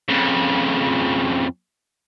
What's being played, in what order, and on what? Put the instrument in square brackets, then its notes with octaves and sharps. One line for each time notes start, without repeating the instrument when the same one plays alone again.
[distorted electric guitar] F2 C#3